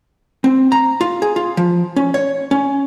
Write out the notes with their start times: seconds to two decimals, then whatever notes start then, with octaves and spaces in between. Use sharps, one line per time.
0.44 C4
0.72 A#5
1.01 F4
1.22 G#4
1.36 F4
1.57 F3
1.96 C#4
2.14 C#5
2.51 C#4